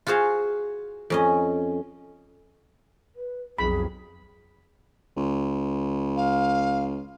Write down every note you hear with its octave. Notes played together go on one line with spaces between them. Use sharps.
F4 F#4 G#4 C5 F5
F2 C#4 D#5
B4
B1 F2 G#4 B5
C#2
F5